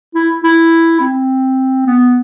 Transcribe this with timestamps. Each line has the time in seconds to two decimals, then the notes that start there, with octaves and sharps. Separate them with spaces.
0.15 E4
0.44 E4
1.00 C4
1.86 B3